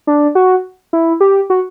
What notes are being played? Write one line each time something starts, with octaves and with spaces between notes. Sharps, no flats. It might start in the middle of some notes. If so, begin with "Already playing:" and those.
D4
F#4
E4
G4
F#4